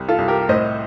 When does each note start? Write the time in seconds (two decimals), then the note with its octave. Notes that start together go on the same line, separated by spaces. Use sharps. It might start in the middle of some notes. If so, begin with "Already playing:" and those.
Already playing: C2
0.08 F4 A4
0.18 C2
0.28 G4 A#4
0.49 A2 C5 D#5